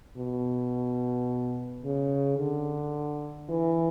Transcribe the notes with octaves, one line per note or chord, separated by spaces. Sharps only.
B2
C#3
D3
E3